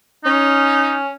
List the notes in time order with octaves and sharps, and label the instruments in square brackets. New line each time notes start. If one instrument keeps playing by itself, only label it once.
[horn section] C#4 [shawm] D#4